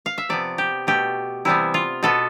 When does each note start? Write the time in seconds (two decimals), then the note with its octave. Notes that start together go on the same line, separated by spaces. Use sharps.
0.06 F5
0.18 E5
0.29 C3 F3 B3 D5
0.58 G4
0.87 B2 A3 G4
1.45 C3 E3 G3 B3 E4
1.74 F4
2.03 B2 B3 A4